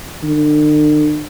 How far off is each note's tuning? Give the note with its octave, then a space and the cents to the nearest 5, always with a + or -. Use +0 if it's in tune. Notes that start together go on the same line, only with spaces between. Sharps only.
D3 +45